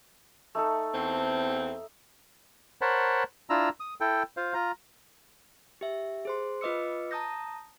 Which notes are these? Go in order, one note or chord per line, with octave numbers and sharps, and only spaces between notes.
A3 D#4 A4
E2 C4
A#4 C5 C#5 F#5 A5 B5
D4 E4 F4 A#5 E6
D#6
E4 A4 G5
F4 C5 F5
F4 A#5
G4 E5
G#4 C5 C6
F4 B4 D#5 D6 E6 C#7
A5 A#5 D#6 G6 A#6